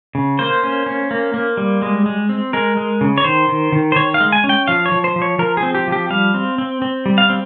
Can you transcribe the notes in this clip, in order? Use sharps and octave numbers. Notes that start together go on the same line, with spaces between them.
C#3
A#3 C5
C#4
C#4
A#3
A#3
G3
G#3
G#3
C4
G#3 A#4
G#3
C#3
C#5
D#3 C5
D#3
D#3
C5
D#3 C#5
F5
G#3
G#5
C#4
G5
F3 F5
C#5
F3
C5
F3
C#5
F3 A#4
G#4
C4
G4
F3 G4
G3 F5
C4
C4
C4
G3
F5
C4